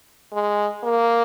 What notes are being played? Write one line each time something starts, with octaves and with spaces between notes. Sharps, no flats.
G#3
A#3